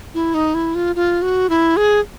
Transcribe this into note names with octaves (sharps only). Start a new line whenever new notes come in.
E4
D#4
E4
F4
F4
F#4
E4
G#4